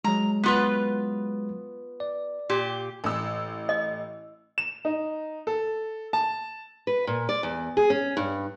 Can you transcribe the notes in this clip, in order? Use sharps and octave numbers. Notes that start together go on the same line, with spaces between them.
F#3 G#3 A#5
B3 F4 B4
D5
A#2 G4
A1 E6
D#5
E7
D#4
A4
A5
B4
A#2
D5
E2
G#4
C#4
G2